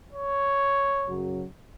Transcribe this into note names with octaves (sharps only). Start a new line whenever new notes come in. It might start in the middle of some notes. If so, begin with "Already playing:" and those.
C#5
F#2 C#3 F#3